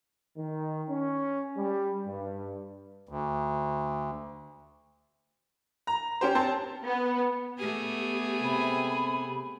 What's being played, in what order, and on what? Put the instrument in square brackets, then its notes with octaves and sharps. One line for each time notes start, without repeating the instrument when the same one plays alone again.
[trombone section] D#3
C#4
G3
G2
[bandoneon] D2
[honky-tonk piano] A#5
C#4 G4 C5
C4 A5
[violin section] B3
[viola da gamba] A3 B3 G#4 [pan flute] G4
[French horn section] C3 [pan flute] B5